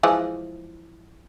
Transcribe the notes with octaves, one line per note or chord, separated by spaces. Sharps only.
E3 F3 G#3